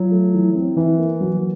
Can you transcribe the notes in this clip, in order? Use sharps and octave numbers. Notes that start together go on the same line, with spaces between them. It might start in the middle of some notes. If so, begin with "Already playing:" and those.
Already playing: F#3 F4
A3
E3
C4
E3 E4
A#3
F#3